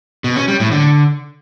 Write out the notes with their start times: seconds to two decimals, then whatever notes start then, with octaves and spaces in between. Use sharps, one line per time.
0.24 B2
0.36 C#4
0.48 G3
0.60 A2
0.72 D3